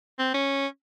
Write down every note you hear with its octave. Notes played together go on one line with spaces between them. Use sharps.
C4
C#4